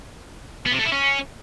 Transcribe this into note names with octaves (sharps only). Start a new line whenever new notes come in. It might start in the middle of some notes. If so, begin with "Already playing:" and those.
B3
C3
A3
E4
C#4